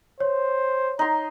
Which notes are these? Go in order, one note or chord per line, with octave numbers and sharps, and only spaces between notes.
C5 C#5
D#4 A#5 C6